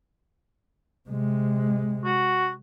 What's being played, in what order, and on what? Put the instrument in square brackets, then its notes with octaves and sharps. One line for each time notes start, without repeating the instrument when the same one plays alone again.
[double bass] C3 G#3
[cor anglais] F#4